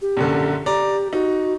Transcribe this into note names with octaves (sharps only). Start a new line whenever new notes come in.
G4
A#1 F#2 D3
G4 D5 A#5
D#4 F#4